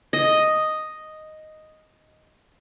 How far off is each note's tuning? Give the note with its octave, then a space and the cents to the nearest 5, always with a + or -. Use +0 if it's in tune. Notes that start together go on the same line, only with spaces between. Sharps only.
D#5 +0